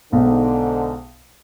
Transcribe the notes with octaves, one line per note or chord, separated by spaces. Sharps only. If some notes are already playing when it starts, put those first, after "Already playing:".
B1 G#2 D3